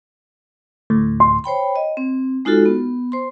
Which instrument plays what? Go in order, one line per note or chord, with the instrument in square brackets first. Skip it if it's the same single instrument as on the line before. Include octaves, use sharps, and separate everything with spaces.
[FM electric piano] D2 A2
[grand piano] C6
[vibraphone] C5 C#5 G5 B5
D#5
C4
G#3 D#4 F4 F#4 A4
B3
C5 C6